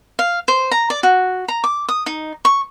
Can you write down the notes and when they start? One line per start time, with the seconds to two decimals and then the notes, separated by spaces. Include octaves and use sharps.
0.19 F5
0.48 C5
0.71 A#5
0.90 D5
1.03 F#4
1.48 A#5
1.64 D6
1.89 D#6
2.06 D#4
2.45 C#6